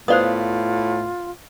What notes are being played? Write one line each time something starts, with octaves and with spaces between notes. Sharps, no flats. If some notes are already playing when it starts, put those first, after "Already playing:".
A2 B3 F4 C5 D5 F5 D#6